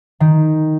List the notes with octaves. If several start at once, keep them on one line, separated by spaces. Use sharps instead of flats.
D#3